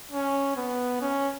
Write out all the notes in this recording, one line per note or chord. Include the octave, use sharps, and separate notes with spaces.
C#4
B3
C#4